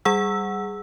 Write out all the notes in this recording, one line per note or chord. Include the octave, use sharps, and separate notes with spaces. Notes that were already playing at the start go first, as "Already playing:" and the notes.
G3 G#4 F#5 E6